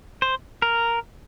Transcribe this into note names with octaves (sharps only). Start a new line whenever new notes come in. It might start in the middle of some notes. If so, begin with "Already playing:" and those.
C5
A#4